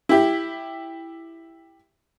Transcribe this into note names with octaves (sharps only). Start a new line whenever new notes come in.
E4 G4